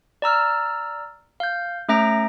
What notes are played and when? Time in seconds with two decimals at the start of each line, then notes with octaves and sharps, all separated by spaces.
0.22 D5 A#5 E6 F6
1.40 F5 G6
1.89 A3 C#4 E5 A#5 A#6 D7